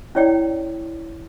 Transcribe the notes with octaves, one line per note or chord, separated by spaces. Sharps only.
C#4 E4 C#5 D5 G5